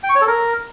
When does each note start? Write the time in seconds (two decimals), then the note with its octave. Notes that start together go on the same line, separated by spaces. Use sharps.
0.03 G5
0.09 C#6
0.15 C#5
0.21 A4
0.27 A#4